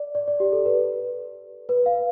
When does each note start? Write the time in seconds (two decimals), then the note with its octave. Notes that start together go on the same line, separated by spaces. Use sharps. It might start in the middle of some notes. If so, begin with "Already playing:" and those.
Already playing: D5
0.15 D5
0.28 D5
0.40 G4
0.53 A4
0.66 B4
1.69 B4
1.86 F5